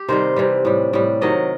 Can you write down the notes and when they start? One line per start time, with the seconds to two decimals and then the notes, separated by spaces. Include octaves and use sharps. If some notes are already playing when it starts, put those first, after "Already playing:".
Already playing: G4
0.08 C3 D#3 G3 C5
0.36 C3 E3 G3
0.65 A2 G3
0.93 A2 G3
1.21 C3 D#3 F#3 D#5